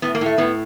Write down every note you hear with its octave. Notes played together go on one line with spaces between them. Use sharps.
A2 B3
A#3
A2 A3
A2 B3